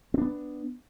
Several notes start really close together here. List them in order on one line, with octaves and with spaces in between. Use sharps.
C4 D4 B3